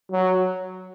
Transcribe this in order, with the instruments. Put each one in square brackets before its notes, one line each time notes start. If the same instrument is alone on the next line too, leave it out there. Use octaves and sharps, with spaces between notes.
[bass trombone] F#3